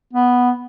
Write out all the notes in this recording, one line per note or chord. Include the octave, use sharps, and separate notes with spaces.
B3